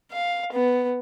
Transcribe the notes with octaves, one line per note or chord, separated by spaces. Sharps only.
F5
B3